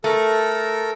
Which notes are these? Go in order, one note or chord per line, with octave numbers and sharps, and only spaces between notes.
A3 A4 A#4